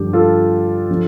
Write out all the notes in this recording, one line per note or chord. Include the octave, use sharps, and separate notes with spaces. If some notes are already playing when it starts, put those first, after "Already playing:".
Already playing: G2 D3 F3 G4
F4 A4
D3 F3